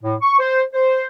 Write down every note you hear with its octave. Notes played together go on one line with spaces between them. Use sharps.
A2
C#6
C5
C5